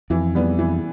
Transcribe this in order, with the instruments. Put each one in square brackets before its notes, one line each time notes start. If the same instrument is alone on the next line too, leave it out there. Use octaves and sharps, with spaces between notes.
[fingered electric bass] F2 [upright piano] E3
[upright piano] G3 B3
E3